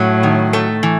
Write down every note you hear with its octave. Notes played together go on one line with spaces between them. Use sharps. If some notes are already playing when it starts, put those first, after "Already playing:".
Already playing: A2 F#3
D#3
A3
E3